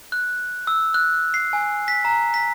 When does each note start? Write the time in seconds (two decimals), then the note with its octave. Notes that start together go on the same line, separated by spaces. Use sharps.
0.12 F#6
0.67 E6
0.94 F#6
1.34 C7
1.53 G#5
1.88 B6
2.05 A#5
2.34 B6